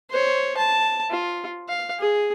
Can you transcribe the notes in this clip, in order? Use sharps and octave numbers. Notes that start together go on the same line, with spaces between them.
C5 C#5
A5
F4
F5
G#4